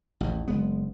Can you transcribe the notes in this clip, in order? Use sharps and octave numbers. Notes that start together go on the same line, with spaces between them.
A1 D#2
F#1 G#3 B3